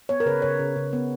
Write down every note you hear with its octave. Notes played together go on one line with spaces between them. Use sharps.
B3 C#5
A#4
C#3 B4
C#3 C#5
C#3
C#3
B3